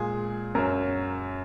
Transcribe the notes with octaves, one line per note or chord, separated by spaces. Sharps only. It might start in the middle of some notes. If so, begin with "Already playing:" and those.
Already playing: A#2 G#3 G#4
F#2 F#3 A#4